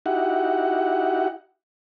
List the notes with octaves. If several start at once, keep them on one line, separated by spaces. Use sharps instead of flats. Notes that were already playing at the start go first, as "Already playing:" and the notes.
D#4 E4 F#4 G4 F#5